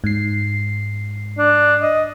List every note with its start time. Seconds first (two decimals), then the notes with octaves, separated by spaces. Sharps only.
0.04 G#2 C7
1.38 D4
1.82 D#5